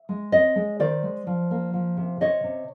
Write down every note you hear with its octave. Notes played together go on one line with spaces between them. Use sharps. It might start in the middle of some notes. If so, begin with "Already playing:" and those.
Already playing: E5
G#3
C4 C#5 D#5
G#3
D#3 C5 D5
G#3
F3
A#3
F3
C3
C3 C#5 D#5
C3